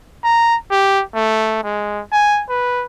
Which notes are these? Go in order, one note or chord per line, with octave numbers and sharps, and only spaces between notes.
A#5
G4
A3
G#3
G#5
B4